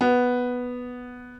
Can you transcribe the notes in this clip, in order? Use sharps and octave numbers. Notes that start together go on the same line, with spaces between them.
B3